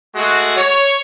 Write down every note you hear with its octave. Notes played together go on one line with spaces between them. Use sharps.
G#3 A3 F#4
C#5